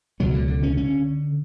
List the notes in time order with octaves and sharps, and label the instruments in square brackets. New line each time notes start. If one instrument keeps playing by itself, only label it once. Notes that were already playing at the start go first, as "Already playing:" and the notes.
[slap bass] C#2 B2 F#3
D3
D3
C#4
D3 C#4